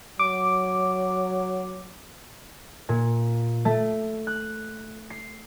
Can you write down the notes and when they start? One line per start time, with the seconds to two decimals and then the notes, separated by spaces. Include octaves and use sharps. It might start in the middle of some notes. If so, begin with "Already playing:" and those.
0.19 F#3 D6
2.89 A#2
3.65 A3
4.27 F#6
5.10 C7